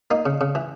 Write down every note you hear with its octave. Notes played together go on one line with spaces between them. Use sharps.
A#3 D#4
C#3
C#3
E3